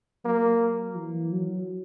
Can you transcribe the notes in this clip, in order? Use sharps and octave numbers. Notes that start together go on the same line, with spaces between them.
F#3 A#3
E3
F#3